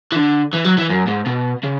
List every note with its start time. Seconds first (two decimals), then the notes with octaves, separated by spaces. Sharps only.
0.12 E3
0.16 D3
0.53 E3
0.64 F#3
0.77 E3
0.90 F#2
1.07 G#2
1.26 B2
1.63 C#3